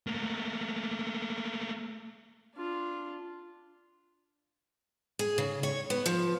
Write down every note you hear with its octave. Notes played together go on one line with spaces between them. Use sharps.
A3 A#3
D4 F4
G#4
C#3
C#5
B3
F3